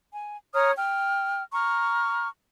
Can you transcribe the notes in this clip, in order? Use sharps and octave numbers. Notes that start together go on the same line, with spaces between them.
G#5
C#5 A#5 D#6 F6
G5 F6
A#5 C#6 F6